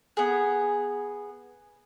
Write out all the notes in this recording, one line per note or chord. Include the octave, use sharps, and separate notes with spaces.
B3 G#4